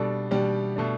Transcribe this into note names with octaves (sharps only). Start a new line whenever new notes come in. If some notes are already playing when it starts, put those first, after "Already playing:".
Already playing: B2 G3 D4 A4
B2 G3 D4 G4
B2 A3 D4